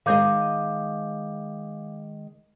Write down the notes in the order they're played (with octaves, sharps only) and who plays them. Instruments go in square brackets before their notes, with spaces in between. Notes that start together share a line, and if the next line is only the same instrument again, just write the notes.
[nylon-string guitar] D#3 G#3 D#5 [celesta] F5 D6 G6